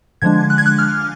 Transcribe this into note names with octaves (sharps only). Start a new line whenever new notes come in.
D3 F3 G#3 D4 G#6
F#6
G#6
F#6
F6